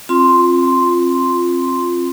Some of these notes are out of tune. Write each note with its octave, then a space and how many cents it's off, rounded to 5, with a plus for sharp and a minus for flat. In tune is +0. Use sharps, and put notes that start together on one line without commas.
C4 +30 F4 +0 C6 +0